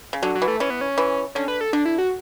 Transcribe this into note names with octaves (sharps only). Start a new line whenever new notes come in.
C#3
D3 F#3
F#3
E3
A3
E3 C#4
B3
C#4
E3
D3 C#4
B4
A4
D3 D4
E4
F#4